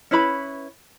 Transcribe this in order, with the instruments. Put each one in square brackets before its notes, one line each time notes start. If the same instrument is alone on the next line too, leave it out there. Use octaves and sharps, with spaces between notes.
[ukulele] C#4 E4 B4 B5